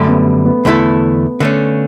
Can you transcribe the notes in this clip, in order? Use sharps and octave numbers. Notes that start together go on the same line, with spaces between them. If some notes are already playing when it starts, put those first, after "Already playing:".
Already playing: F#2 D3 G3 A3
B3
B3
E2 D3 A3 E4 A4
D3 A3 C#4